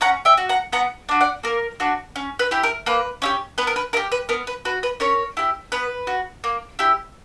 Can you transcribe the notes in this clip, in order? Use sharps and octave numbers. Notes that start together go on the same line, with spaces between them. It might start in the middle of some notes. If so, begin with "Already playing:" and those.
C#4 F#5 A#5
E5 G5
F#4
F#5 A#5
B3 F#5 A#5
D4 F#4
D5 F#5
A#3 A#4
D4 F#4
C#4
B4
E4 G4
A#4
A#3 B4
C#4 E4 G4
B3 B4
A#4
B4
E4 A#4
G4
B4
B3 A#4
B4
F#4 B4
B4
C#4 A#4 C#5
E4 G4
B3 B4
F#4
A#3
E4 G4